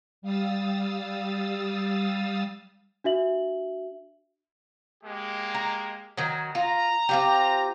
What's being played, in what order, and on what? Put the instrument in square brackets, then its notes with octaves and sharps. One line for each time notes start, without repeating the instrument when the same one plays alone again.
[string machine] G3 F5 D#6 E6 A6
[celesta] D4 F#4 E5 F#7
[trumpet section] G#3 A#3 G4
[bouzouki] A#5
D#3 F#3
[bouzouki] F4 [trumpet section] A#5
[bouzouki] C4 F4 G4